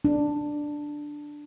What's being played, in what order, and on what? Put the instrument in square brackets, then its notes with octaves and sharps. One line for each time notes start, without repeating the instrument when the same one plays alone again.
[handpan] D4